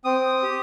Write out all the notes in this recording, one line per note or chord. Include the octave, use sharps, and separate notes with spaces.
C4 D#6
G4